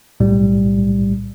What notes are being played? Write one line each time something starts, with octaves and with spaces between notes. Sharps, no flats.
B1 A2 G3